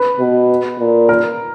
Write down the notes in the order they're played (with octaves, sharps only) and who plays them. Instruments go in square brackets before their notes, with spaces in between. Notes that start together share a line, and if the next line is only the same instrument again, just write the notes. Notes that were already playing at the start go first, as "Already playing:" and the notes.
Already playing: [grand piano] B4
[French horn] B2
A#2
[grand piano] A#4